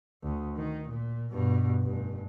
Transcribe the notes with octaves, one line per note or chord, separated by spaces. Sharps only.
D2
D#3
A#2
G2 B2
F1 G2